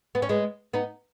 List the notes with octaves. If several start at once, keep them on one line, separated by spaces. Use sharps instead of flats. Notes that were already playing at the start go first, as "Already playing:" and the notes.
B3
C#4
G#3 B3
B3 D#4